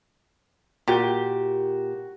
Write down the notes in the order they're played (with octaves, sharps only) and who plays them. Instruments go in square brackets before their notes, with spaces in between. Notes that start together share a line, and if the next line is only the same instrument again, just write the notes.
[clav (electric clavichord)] A#2 [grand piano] F#4 [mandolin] G4